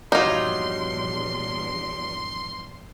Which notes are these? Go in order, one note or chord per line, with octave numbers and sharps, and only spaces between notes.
A#1 E2 G2 F#3 G3 D#4 F4 C6